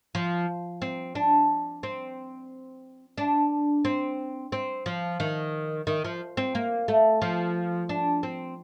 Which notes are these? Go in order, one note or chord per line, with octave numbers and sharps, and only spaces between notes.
F3
C4
D4
C4
D4
C4
C4
F3
D#3
D#3
F3
C4
A#3
A3
F3
D4
C4